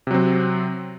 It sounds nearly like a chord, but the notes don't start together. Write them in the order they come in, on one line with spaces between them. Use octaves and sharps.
C3 F#3 C4